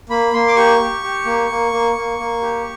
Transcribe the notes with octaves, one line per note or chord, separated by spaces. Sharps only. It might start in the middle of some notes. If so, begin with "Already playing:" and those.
A#3 B5
A#3 C6
D6
G4 C#6
G4
G4
A#3
A#3
A#3
A#3
A#3
G4